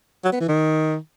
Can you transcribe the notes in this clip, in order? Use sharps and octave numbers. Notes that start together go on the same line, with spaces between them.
F#3
B3
E3
D#3